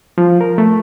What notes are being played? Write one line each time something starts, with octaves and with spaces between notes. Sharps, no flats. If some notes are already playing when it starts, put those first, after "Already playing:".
F3
A#4
A3